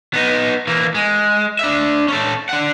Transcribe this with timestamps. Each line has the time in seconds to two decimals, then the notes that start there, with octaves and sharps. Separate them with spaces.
0.14 B3 D#4
0.67 E3 A#3
0.95 G#3
1.59 D4 E5
2.08 C#4 A4
2.49 D4 F#5